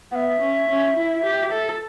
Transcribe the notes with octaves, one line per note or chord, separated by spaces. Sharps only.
B3 E5 F#5
C#4
C#4
E4
G4
A4